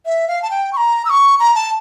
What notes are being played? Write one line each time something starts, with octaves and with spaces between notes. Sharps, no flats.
E5
F5
A5
G5
C#6
A#5
E6
C#6
A#5
A5